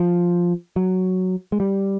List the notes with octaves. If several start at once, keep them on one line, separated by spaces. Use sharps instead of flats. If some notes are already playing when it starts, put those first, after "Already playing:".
Already playing: F3
F#3
G#3
G3